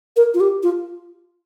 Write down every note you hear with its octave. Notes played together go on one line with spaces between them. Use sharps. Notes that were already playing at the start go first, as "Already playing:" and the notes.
A#4
F4
G4
F4